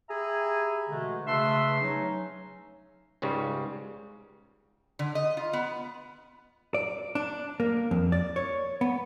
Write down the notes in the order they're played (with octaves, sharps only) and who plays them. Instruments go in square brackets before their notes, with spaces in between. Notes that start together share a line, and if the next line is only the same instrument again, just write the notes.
[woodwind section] G4 G#4 E5 G#5 A#5 B5
B2 D3 E3 G#3 A3
C#3 A3 D4 B4 E5 C6
F#3 C#4 D#4
[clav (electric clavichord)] C#2 G#2 C#3 G3
[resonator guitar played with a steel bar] D3
D#5
F4
B3
[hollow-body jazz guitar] D5
D4
A#3
F2
D5
C#5
B3